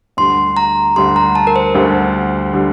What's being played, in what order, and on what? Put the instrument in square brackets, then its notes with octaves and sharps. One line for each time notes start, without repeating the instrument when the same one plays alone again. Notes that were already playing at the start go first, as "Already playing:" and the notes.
[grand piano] D2 D3 G3 [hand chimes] C6
[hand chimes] A#5
[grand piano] D2 D3 G3 [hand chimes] C6
[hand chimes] A#5
A5
A#4
C5
[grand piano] D2 D3 G3
D3 G3